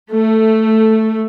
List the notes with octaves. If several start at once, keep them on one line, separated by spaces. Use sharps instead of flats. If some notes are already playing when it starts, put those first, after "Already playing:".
A3